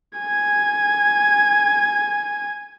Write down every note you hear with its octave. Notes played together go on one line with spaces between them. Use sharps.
G#5 G#6